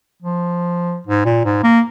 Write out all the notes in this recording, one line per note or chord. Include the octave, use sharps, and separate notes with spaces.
F3
G#2
A#2
G#2
A#3